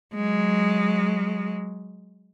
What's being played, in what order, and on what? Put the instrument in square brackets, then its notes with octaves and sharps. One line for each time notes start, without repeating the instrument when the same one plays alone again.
[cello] F#3 G#3